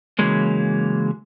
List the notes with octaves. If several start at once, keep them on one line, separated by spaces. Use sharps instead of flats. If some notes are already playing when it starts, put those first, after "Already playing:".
C#3 E3 F#3 G#3 A#3